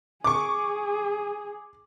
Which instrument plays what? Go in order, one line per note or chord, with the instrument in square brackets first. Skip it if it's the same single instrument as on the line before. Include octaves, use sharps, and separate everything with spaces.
[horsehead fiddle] G#4 [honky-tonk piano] C#6 D6